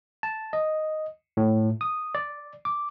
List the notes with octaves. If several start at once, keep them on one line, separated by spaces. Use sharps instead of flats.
A5
D#5
A2
D#6
D5
D6